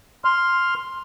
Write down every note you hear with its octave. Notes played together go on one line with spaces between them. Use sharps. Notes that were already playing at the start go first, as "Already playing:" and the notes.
C6 F6